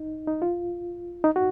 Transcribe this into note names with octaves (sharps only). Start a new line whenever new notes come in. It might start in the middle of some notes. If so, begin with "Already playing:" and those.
Already playing: D#4
D#4
F4
D#4
F#4